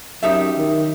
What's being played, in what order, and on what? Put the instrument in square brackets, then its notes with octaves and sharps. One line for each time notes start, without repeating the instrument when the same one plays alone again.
[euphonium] F#2 [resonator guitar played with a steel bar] D#4 G4 E5
[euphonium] D#3